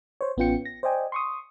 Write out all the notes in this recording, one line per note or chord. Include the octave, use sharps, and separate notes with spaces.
C5 C#5
A1 B3 C#4 F4 G5 C#7
A#6
C5 D5 D#5 G5 G#5
C6 C#6 D#6